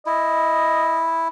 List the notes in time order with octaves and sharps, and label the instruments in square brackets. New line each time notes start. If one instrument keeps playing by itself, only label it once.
[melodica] E4 [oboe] D#5